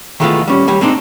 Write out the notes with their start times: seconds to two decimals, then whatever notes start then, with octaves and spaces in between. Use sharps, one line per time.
0.20 D#3 E3 G#3 A3 B3 F4
0.47 G3 C#4
0.67 D#2 G3 C#5
0.81 G#3 C4 D4 D#4